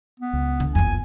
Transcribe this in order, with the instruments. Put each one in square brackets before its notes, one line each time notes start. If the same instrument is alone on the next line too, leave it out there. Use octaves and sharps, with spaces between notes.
[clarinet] B3
[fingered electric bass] C#2
[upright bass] D3
[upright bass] F#1 F2 [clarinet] G#5